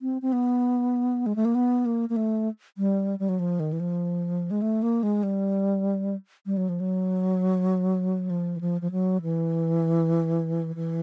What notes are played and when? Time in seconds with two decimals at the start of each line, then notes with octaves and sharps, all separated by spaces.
0.02 C4
0.22 C4
0.33 B3
1.26 G#3
1.36 A3
1.45 A#3
1.55 B3
1.85 A#3
2.09 A#3
2.16 A3
2.78 G3
3.19 G3
3.29 F#3
3.39 F3
3.60 D#3
3.73 E3
3.80 F3
4.51 G#3
4.62 A3
4.82 A#3
5.03 G#3
5.23 G3
6.46 G3
6.57 F#3
6.69 F3
6.80 F#3
8.30 F3
8.56 E3
8.61 F3
8.81 F3
8.91 F#3
9.22 E3
10.76 E3